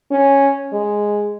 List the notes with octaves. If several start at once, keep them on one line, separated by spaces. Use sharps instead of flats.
C#4
G#3